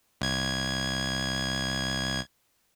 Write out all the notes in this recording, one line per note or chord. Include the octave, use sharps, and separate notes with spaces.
C2 G#6